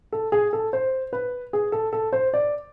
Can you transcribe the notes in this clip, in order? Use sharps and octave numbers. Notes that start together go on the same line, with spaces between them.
A4
G#4
A4
C5
B4
G#4
A4
A4
C5
D5